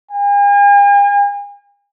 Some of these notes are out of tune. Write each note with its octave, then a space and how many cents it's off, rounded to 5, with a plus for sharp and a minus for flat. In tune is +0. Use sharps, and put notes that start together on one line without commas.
G#5 -45